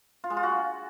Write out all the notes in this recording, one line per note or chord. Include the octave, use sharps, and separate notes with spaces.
F4
G#3
F4
F#4